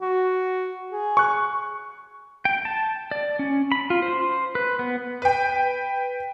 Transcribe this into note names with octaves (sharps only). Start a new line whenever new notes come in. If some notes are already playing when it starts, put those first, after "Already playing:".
F#4
G#4
C#6 F#6
G5
A5
D5
C#4
B5
F4
C5
B4
B3
B4 G5